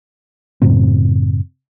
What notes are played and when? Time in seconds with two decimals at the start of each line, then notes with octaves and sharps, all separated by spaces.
0.62 F#2 A2 C#3 C4